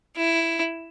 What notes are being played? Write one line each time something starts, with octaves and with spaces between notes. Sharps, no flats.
E4